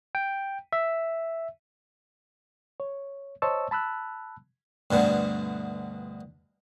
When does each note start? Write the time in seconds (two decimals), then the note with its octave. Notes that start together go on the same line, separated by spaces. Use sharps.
0.15 G5
0.73 E5
2.80 C#5
3.42 C5 C#5 D#5 A5 C#6 E6
3.71 A5 B5 E6 F#6
4.91 D2 G2 B2 D3